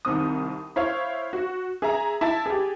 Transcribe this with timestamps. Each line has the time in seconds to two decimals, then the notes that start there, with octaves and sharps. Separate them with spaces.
0.05 C2 D#3 C4 D#6
0.76 E4 C5 C#5 F5
1.33 F#4
1.82 G#4 E5 A#5
2.21 E4 A5 A6
2.46 G4 G#4